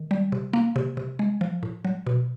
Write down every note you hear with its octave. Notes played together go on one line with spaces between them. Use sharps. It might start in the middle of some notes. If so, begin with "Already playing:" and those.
Already playing: D#3
G3
C3
A#3
C3
C3
G#3
F3
A2
F#3
B2